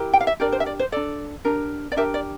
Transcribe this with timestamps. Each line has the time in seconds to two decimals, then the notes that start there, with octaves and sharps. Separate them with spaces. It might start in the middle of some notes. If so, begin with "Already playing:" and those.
Already playing: E4 G4 A#4
0.13 G5
0.21 F5
0.27 E5
0.40 D4 G4 A#4 D5
0.53 C5
0.60 E5
0.66 D5
0.79 C5
0.92 D4 A4 D5
1.45 D4 G4 A#4
1.92 D5
1.96 D4 G4 A#4 E5
2.14 D5